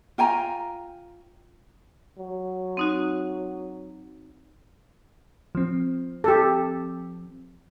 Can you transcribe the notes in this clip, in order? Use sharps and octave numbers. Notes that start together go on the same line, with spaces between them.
F4 G5 G#5 A#5
F#3
C4 D#4 F#4
F3 C4
G4 A4